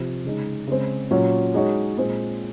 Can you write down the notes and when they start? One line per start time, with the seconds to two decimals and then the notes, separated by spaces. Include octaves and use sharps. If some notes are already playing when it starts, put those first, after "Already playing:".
Already playing: C3 F3 C4
0.25 C#3 G#3 D#4
0.67 C#3 G#3 C4
1.11 A#2 F#3 C#4
1.54 G#3 D#4 F#4 C#5
1.97 A#2 G#3 C4